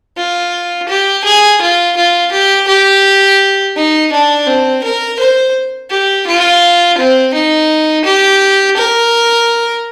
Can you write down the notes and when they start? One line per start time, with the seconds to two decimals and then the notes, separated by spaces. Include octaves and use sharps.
0.17 F4
0.88 G4
1.24 G#4
1.61 F4
1.97 F4
2.32 G4
2.67 G4
3.76 D#4
4.12 D4
4.47 C4
4.83 A#4
5.19 C5
5.90 G4
6.27 F4
6.98 C4
7.34 D#4
8.05 G4
8.77 A#4